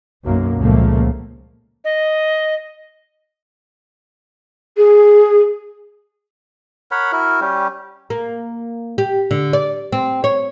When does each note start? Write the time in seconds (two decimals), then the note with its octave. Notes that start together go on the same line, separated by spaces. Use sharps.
0.24 B1 F#2 B2 A#3
0.58 C#2 A#2 F3 A3 A#3
1.85 D#5
4.77 G#4
6.91 A#4 C#5 F#5 B5
7.12 E4 F#4 A#4
7.41 G3 C#4 G4
8.10 A#3
8.98 G4
9.31 D3
9.53 D5
9.92 C4
10.24 C#5